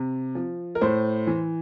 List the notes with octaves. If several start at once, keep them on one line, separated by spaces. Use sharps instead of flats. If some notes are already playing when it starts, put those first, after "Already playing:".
Already playing: C3
F3
A#4
A2 C5
E3